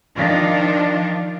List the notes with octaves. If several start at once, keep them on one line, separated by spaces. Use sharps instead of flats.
D#3 F3 D4 F4